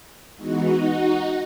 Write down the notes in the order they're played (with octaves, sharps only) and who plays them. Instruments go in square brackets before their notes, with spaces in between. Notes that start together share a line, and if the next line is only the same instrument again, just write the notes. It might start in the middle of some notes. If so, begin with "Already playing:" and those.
[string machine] E3 G#3 B3 D#4 F#4